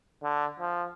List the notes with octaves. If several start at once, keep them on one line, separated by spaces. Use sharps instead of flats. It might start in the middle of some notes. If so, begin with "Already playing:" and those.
D3
F3